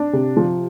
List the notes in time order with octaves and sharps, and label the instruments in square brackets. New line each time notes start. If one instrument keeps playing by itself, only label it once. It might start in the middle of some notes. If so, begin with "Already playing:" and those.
Already playing: [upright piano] D4
C3
F3